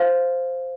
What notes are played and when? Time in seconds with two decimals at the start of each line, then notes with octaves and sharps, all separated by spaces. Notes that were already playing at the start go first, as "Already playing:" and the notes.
Already playing: C5 F5